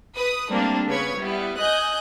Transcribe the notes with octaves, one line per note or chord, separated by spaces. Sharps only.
B4 D#6
G3 A3 A#3 C4 D4
C#3 B3 B4 C#5 G#6
G3 B3 E4
D#5 G#5 D#6 F#6 G6 A#6